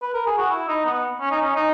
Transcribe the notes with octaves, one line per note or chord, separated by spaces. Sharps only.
B4
A#4
G#4
F#4
E4
D#4
B3
C#4
D#4
C#4
D#4